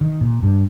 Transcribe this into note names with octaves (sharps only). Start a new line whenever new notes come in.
D#3
A#2
G2